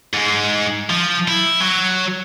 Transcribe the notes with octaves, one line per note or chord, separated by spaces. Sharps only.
G#2 G#3
F3
E4
F#3